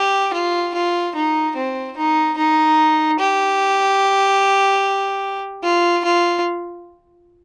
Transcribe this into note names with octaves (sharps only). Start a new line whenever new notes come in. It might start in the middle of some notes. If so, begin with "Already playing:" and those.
Already playing: G4
F4
F4
D#4
C4
D#4
D#4
G4
F4
F4